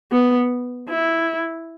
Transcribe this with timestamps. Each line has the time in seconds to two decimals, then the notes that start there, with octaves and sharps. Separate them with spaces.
0.11 B3
0.90 E4